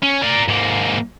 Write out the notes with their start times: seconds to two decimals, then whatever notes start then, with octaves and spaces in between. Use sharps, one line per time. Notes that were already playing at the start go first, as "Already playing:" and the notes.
0.02 C#4
0.22 A#4 D5
0.48 G#2 A#3